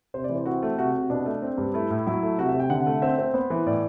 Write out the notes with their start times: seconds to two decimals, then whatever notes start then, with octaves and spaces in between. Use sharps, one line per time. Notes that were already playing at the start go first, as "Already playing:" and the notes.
0.14 C3 C5
0.24 D5
0.29 E3
0.36 C5
0.45 C4 F#4
0.62 A3
0.78 C3 F#4
0.94 C3
1.10 B2 D4
1.26 A3
1.42 C4
1.58 G2
1.74 A3 E4
1.90 A2
2.07 F#3 E4
2.23 A3
2.38 C3 F#4
2.49 E5
2.54 C3
2.60 G5
2.70 D3 F#5
2.87 A3
3.02 C4 E5
3.18 C4
3.34 B3 C5
3.50 E3
3.67 A2 D5